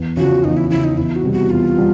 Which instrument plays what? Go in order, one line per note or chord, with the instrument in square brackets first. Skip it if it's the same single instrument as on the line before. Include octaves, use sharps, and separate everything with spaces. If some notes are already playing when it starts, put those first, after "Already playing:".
Already playing: [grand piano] E2
[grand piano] C#3 F3 [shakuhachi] F#4
[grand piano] E2 [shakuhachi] D#4
[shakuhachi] E4
[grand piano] C#3 F3 [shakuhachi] E4
[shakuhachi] D#4
[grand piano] E2 [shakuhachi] E4
[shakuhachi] F#4
[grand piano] C3 E3 G3 B3
[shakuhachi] F#4
[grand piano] E2 [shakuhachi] F4
[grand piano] G3 B3